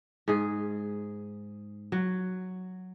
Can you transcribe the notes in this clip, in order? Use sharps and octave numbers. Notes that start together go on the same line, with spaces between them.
G#2 G#4
F#3